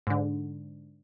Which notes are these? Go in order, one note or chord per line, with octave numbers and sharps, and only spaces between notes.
G#2 D3